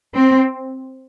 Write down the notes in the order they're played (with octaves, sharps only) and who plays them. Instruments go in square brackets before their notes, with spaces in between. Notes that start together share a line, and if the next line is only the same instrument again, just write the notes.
[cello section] C4